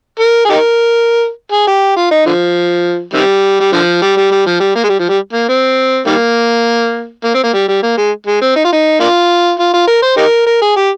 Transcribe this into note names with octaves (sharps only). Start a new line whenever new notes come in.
A#4
G#4
D#4 G4 A#4
G#4
G4
F4
D#4
D3 F3
C3 D#3 G3
G3
D3 F3
G3
G3
G3
F3
G3
A#3
G#3
G3
F3
G3
A#3
C4
D#3 G3 A#3
A#3
C4
A#3
G3
G3
A#3
G#3
G#3
C4
D#4
F4
D#4
A#3 D4 F4
F4
F4
A#4
C5
D#4 G4 A#4
A#4
G#4
G4